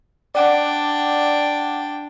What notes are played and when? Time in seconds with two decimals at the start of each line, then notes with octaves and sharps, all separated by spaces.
0.35 D4 D5 F#5 G5 D6